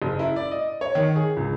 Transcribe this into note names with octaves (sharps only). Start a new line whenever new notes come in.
F#1
E4
D5
D#5
C#5
D#3
G#4
C#2